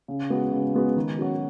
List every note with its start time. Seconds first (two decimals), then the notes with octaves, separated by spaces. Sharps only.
0.08 C#3
0.30 G#3 B3 F#4
0.52 C#3
0.74 G#3 B3 F#4
0.96 D#3
1.18 F#3 C#4 F#4